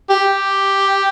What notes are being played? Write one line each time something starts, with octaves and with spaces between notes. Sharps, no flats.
G4